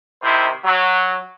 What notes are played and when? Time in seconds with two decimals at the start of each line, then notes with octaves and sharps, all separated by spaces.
0.22 C3 D#3 E4 C5
0.65 F#3